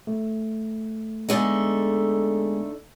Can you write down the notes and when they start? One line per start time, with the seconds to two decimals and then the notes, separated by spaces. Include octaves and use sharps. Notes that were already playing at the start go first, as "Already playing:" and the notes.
0.07 A3
1.29 D3 G#3 A3 B3 D#4 G#4